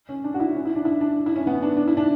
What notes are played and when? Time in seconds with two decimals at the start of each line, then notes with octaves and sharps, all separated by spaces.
0.09 C#4
0.24 D4
0.34 F#4
0.40 E4
0.55 C#4
0.65 E4
0.76 D4
0.85 E4
1.01 D4
1.26 E4
1.36 C#4
1.47 B3
1.62 D4
1.77 D4
1.88 E4
1.97 D4